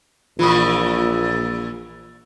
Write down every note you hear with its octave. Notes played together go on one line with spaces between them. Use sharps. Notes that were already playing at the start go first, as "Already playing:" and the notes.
A#1 A#2 E3 F4 B5 D#6